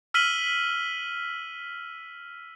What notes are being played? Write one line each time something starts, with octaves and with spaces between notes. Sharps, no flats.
E6 F6 B6 D#7 F#7 G7